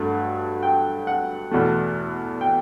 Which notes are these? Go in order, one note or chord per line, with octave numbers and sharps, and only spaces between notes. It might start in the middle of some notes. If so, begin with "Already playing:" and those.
Already playing: G2 F#3 A3
G5
F#5
E2 B2 A3
G5